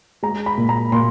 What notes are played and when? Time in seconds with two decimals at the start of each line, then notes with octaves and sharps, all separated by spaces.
0.23 G#3 A#5
0.46 B5
0.58 A#2
0.69 A#5
0.92 A#2 C6